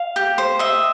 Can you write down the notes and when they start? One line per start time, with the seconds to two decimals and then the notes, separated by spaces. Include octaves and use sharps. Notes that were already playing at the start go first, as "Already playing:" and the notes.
Already playing: F5
0.16 G4
0.38 C5
0.59 D#5 E5